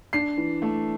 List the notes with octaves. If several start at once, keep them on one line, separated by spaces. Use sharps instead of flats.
D4 C7
E3
A3